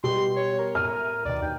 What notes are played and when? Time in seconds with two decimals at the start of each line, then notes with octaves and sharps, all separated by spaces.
0.04 B2 G3 B3 G4 C6
0.36 C#5
0.59 A#4
0.75 A2 E5 F6 D#7
1.25 D2 B2 D#3 D5
1.42 D#2 G5